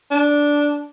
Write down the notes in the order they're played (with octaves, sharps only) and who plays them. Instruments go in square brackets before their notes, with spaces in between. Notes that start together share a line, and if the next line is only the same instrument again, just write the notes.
[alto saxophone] D4